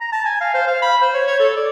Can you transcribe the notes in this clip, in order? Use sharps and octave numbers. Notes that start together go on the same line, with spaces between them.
A#5
A5
G#5
F5
C5
F5
B5
C5
C#5
C#5
A4
D5